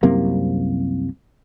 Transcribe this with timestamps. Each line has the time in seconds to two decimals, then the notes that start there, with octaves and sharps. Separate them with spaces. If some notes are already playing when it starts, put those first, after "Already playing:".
0.03 C2 F#2 C3 A#3